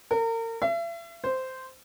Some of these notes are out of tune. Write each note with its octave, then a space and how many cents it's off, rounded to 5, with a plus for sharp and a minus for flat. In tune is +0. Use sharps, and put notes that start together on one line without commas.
A#4 -35
E5 +40
C5 -10